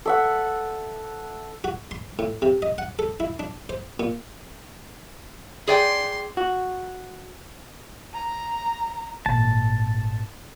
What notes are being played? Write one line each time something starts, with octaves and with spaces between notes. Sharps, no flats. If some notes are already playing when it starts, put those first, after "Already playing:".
A4 E5 F#5
F#4
C6
A2
C3
D#5
F#5
A4
E4
D4
C5
A#2
G#4 D5 G5 C6
F#4
A#5
G#1 A#2 A5